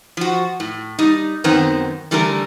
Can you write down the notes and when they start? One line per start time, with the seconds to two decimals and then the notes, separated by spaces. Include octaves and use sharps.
0.17 F3 F#4
0.60 A2
0.99 G3 D#4
1.44 F#2 D#3 B3 C4
2.11 D3 E3 G3 A3 A#4